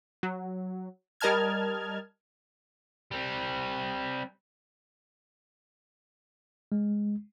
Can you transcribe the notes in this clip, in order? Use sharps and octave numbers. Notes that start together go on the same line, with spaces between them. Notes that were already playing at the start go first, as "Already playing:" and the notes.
F#3
G3 A#4 D#5 A5 F6 G#6
G3 C4
G#3